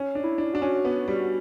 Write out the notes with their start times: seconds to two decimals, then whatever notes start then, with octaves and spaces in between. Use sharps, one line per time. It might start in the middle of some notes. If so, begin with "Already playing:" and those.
Already playing: C#4
0.15 D4
0.24 E4
0.38 D4
0.54 D4 F#4
0.62 C#4
0.85 B3
1.08 G3